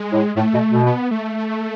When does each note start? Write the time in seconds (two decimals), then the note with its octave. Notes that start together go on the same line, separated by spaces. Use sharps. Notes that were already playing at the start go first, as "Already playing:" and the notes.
Already playing: G#3
0.12 A2
0.36 A2 A3
0.53 B2
0.70 B2
0.86 B3
1.11 A3